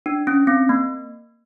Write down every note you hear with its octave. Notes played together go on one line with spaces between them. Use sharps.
D4
C#4
C4
A#3